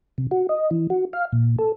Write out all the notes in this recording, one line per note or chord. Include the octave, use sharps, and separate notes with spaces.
C3
F#4
D#5
E3
F#4
F5
A#2
A4